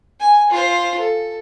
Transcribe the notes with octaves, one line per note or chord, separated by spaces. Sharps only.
G#5
F4 C5
A4